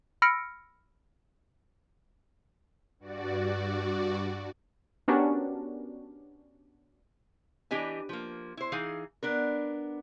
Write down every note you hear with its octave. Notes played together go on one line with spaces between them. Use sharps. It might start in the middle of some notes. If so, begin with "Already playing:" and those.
B5 E6 F6 A#6 C#7 D7
G2 F#4 D5
B3 C#4 D4 F#4 G4 A#4
E3 D4 G4 D#5 G#5
F3 A#3
E4 C5
E3 D#4 G#4 F5
B3 D4 A#4